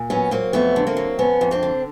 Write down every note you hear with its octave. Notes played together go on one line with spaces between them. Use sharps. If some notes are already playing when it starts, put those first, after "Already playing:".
Already playing: A#2
F#3 B3 C#4
F#3 A#3 C4
F2 A3 B3
D3
A#3 C4
F#3
F2 B3 C#4
F2
C4 D4
D3